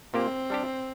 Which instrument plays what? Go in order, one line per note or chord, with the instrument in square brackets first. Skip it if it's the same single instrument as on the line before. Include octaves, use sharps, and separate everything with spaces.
[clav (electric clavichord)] A#2 A#3 G4 [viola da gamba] C4
[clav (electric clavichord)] G3 D4 G4